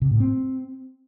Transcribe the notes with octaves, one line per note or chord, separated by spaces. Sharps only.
C3
A2
C4